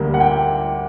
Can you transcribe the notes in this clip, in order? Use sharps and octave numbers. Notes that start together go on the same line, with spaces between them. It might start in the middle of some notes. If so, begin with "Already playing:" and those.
Already playing: D2 D3 G3 A#3
F#5
G5